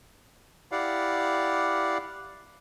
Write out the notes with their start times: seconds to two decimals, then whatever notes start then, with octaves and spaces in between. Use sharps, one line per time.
0.72 E4 G4 D5 F5 F#5